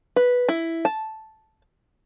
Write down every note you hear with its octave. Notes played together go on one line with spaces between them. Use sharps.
B4
E4
A5